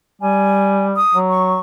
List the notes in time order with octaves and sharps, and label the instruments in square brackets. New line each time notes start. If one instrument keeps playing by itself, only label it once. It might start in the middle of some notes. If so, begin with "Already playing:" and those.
[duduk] G3 [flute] G#5
[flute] D#6
[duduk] F#3
[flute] C#6